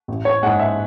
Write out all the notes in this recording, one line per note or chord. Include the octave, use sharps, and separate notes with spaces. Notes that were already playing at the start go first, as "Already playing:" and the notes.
A1
C#5
G#2 G#3 F#5
E5